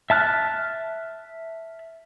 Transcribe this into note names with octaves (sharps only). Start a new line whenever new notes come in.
E5 A5 F6 F#6